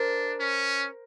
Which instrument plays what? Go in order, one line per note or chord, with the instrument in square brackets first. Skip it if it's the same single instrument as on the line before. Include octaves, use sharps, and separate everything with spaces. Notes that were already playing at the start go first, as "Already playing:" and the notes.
Already playing: [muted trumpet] D4 [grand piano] A#4 C5
[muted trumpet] C#4